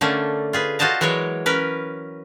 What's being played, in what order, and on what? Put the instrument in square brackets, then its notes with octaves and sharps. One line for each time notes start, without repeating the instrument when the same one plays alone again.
[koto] D3 A3 A#3 C#4
F4 G#4 B4
F4 F#4 C5 D#5 A5 A#5
E3 F#3 G#3 A#4 C#5
C#4 A#4 B4